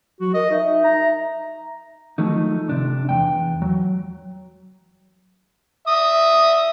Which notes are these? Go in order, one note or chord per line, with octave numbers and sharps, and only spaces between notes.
F#3 F#4
A#4 D#5
D#4 E5
A#5
D#3 F3 F#3 A3 D#4
C3 D4
E2 F#3 G5
F#3
E5 D#6